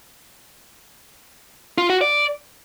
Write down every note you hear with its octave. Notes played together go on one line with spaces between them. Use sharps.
F4
F#4
D5